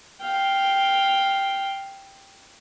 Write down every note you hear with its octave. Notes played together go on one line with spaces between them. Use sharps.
F5 G5